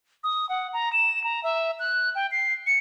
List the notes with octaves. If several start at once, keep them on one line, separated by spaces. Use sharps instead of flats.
D#6
F#5
A#5
E7
A#5
E5
F#6
G5
C7
C#7